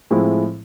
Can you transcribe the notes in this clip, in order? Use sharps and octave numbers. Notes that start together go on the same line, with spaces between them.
A2 F3 G#3 C4 E4